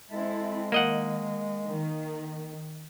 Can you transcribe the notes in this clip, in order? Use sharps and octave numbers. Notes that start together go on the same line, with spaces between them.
G#3 C4 E4 A4
D#3 A#3 D#5 F#5
D#3